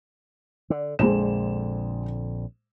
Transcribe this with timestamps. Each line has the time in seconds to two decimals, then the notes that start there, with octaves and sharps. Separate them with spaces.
0.70 D3
0.99 A#1 F2 D3 G#3 C5 E7